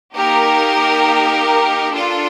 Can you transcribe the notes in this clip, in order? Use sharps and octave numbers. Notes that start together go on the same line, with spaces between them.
A#3 D#4 G4 A#4
D4 F4 A4